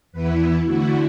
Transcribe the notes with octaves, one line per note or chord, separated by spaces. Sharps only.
E2 E3 B3 E4 B4
D3 A3 E4 F#4